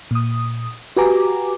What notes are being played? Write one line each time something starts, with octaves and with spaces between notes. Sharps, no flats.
A#2 D#6
F#4 G4 B4 G#5 A#5 D6